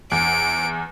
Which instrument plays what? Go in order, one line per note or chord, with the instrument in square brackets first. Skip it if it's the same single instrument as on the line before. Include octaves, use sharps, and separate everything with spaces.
[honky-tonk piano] E2 [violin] D7